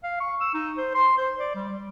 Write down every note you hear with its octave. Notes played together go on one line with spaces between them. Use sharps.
F5
C#6
E6
D#4
C5
C6
C5
D5
G3
G3